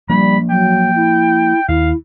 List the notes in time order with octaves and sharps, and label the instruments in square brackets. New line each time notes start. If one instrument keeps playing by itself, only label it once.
[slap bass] F3 A#3 D4 [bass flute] G3 [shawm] B5
[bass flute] F#3 [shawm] G5
[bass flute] E4
[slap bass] D#2 [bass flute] E4 [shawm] F5